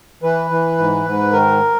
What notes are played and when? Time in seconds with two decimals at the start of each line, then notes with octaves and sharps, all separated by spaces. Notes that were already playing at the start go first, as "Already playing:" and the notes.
0.23 E3 B4
0.51 E3
0.78 G#2
1.06 G#2
1.32 D#3 A#4